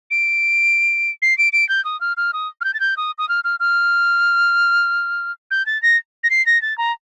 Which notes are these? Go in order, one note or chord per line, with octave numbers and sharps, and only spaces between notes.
D7
C7
D7
D7
G6
D#6
F6
F6
D#6
F6
G6
A6
G6
D#6
D#6
F6
F6
F6
G6
A6
A#6
A#6
C7
A#6
A6
A#5